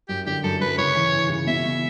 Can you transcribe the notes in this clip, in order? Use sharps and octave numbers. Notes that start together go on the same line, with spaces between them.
F#2 G4
D3 G4
F#2 A4
F#2 B4
C#3 C#5
E3
E3
C#3
B2 E5
B2